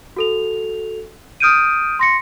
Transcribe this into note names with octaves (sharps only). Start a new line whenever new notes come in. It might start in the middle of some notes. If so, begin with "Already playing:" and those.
F#4 A4 F7
D#6 F6 G6 D7 D#7
C6 A#6 C#7